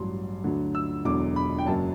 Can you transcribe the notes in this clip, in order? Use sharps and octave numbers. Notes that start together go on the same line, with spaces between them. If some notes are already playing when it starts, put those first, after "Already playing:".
Already playing: A1 G2 F#3 C6
D2 D3 F#3
E6
E1 E2 D3 F#3 D6
B5
G5
F#1 F#2 F#3 A5